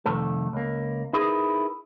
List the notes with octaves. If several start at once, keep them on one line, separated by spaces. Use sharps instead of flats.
C2 F2 D#3 A3 A4
C#2 A#3
D#4 E4 G#4 A#4 B4